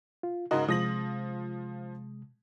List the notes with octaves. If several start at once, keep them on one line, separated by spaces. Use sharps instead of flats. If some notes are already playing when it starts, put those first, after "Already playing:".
F4
G#2 C#3 F#4 A#4 D#5 A#5
C3 F3 G#3 D#6 A#6 F#7